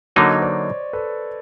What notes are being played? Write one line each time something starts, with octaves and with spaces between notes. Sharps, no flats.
D3 F#3 A#3 D#4 C#5 D#5
C5 D5
A4 B4